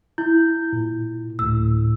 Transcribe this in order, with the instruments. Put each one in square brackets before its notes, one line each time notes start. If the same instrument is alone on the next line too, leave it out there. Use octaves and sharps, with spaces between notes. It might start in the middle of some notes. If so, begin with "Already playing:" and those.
[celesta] E4 [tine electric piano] G6
[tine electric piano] A#2
[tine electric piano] D2 A2 [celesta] E6